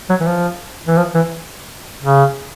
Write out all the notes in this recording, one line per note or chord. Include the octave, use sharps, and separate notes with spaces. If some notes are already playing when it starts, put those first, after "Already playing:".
F#3
E3
F3
E3
F3
E3
C#3